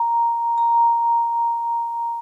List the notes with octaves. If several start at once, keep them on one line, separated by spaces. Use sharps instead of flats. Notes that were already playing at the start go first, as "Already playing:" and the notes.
Already playing: A#5
A#5